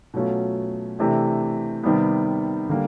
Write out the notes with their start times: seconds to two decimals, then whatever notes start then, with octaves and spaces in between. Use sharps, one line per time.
0.14 B2 F#3 A3 C#4 F4
0.99 C3 E3 A3 D4 G4
1.83 C3 D#3 G3 B3
2.69 D3 G3 A#3